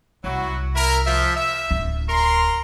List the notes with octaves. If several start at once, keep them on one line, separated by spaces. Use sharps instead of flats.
C2 F#3 E4 F#4
E4 A#4
F3 E5
E5
D1 F4
A#4 A#5 C6